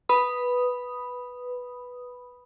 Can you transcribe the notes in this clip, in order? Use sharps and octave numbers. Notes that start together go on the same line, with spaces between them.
B4 B5 D#6